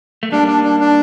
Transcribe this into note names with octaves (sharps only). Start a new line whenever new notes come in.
A3
G3 A#3 D4
D4
D4
D4